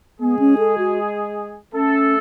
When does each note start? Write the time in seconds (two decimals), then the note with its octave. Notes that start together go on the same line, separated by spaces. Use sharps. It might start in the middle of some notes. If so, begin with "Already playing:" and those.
0.20 G#3 B3 G#4
0.39 C#4
0.58 A4
0.78 F#4
1.73 A3 C#4 A4